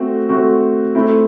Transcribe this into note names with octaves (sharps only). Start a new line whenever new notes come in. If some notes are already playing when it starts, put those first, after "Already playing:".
Already playing: A3 C4 F#4
A3 C4 F#4
A3 C4 E4